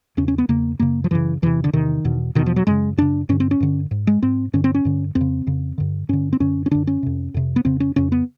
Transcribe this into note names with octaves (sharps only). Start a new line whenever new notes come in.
E2 C#3 C#4
C#4
B3
E2 C#3 A#3
F#2 C#3 A#3
F3
F#2 C#3 E3
E2 C3 E3
D3
E2 C3 D#3
E2 B2
E2 B2 D#3
F3
F#3
F#2 C#3 G#3
F#2 C#3 D4
G2 D3 C#4
C4
C#4
G2 D3
G#2
G#3
G#2 C4
G2 D3 C#4
C4
C#4
G2 D3
F2 C4
C#3
F2 C#3
G2 D3
G2 D3 C#4
C4
F#2 D3 C#4
C#4
F#2 D3 D4
C#4
F2 C3
F2 C3
B3
F2 C#3 C4
C#4
F2 C#3 C#4
B3